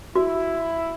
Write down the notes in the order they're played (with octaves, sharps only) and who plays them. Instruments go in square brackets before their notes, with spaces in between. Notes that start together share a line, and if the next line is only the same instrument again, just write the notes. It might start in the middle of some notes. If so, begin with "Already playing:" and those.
[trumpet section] E4 [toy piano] F#4